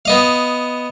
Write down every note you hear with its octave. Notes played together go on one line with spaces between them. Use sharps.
B3 D#5 F5